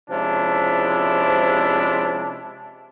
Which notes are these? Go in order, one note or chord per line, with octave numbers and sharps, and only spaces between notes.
C3 F3 G#3 C#4 D4 E4